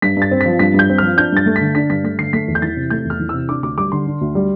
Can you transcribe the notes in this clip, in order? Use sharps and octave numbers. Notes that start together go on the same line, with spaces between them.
G2 B6
G2 A6
C4
B6
F3
G2 B6
G2 G6
C4
F3 F6
D4 G6
G2 A6
A3
B6
D3
D4 B6
G2 B6
A3 B6
D3 C7
A3 B6
E2
G6
E3 A6
C3
A3 G6
E2
F6
E3
C3 E6
D4 D6
D2 D6
G3 D6
D3 C6
D4
D2
G3